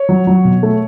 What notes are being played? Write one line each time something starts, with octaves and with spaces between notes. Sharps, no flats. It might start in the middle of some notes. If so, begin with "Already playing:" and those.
Already playing: C#5
F#3
F#3
B2
A3